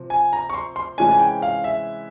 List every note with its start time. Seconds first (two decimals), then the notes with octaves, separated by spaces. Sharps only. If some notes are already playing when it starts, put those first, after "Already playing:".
Already playing: C3 F3 C4
0.10 G#5
0.33 A#5
0.50 C#6
0.54 C6
0.76 C6
0.98 C3 E3 G#3 C#4 G#5
1.11 G#5
1.19 G5
1.42 F5
1.64 E5